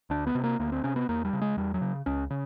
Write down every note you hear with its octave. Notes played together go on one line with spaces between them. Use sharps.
D2 D4
B3
C3
A#3
D2 A#3
C4
C3 C#4
B3
E2 A#3
G3
C#3
G#3
E2 G3
F#3
C#3
C#2 C#4
C#3